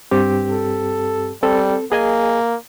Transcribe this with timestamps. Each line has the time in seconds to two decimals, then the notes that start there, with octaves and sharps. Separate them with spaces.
0.11 G2 C4 G4
0.50 A4
1.43 G3 C4 A4
1.92 A#3 G#4 D#5 G#5